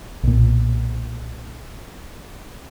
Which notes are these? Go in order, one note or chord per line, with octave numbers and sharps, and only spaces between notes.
B1 A#2